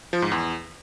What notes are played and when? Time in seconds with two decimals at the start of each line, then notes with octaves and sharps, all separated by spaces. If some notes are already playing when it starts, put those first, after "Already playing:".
0.13 F3
0.22 G#2
0.32 E2